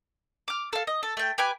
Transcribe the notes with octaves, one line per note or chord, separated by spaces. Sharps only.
D6 F6
A4 F5
D#5
A4
A3 G5
G4 B4 G#5 D6